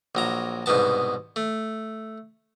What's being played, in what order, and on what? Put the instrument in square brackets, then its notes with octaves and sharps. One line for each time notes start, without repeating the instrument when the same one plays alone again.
[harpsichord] A#1 F#3 A#5
C2 G#2 B2 B3 A5
A3